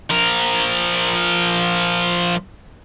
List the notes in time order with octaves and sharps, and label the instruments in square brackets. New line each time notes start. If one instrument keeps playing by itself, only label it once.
[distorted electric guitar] F3 A#4